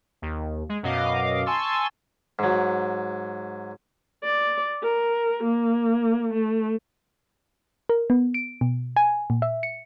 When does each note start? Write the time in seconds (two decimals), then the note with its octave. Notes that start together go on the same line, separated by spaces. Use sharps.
0.22 D#2
0.69 G#3
0.83 F#2 B2 D#5 F5 D6
1.46 G#5 A5 C6 C#6 E6 A6
2.39 G#2 F#3
4.23 D5
4.83 A#4
5.43 A#3
6.33 A3
7.89 A#4
8.10 B3
8.34 D7
8.61 B2
8.97 G#5
9.30 A#2
9.42 E5
9.63 C#7